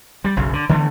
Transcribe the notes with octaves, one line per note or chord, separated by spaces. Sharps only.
G3
F#1 B1 F#2 F#3
D3
D3 E3 A3 B3